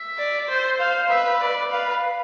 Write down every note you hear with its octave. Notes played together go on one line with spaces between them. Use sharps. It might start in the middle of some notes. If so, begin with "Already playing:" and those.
Already playing: E5
D5
C5
C5 F5
B4 E5
D5
B4 F5